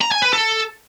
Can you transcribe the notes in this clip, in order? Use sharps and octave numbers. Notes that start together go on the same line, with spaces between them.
A#5
G#5
B4
A4